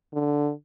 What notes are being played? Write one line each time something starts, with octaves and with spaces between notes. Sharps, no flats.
D3